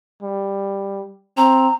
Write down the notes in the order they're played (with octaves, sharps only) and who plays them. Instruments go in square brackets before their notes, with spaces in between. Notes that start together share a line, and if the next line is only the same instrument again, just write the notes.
[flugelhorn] G3
[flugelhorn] C4 [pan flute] A#5